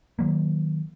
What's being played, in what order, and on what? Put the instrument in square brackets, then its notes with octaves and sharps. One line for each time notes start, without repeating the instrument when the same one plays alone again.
[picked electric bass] D#3 F#3 A#3